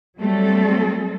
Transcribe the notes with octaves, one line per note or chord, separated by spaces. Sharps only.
F#3 G3 A3 C4 A4